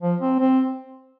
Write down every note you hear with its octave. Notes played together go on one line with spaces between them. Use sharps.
F3
C4
C4